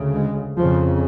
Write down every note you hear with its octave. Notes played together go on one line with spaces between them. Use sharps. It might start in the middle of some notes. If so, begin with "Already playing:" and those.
Already playing: D2 C#3
G#3
F2 C#3 F3